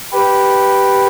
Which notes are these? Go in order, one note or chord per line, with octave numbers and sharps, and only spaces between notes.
G4 B4